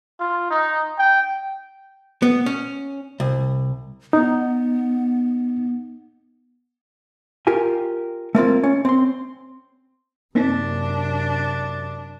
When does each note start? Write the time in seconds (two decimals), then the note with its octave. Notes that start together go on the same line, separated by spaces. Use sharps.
0.20 F4
0.50 D#4
0.98 G5
2.22 B3
2.46 C#4
3.20 C2
4.13 B3 D#4
7.47 F4 G4 A#4 G#5
8.35 A3 A#3 C4 F4
8.63 C#4
8.85 C4 C6
10.35 F#2 C3 A#3 C4 D4 D#4